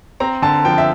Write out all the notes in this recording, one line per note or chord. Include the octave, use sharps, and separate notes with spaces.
C4 A#5
D3 A5
F3 G5
E5